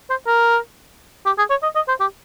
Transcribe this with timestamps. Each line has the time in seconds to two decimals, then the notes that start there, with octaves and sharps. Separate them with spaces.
0.10 C5
0.27 A#4
1.26 G4
1.38 G#4
1.50 C#5
1.63 D#5
1.76 D#5
1.88 C5
2.00 G4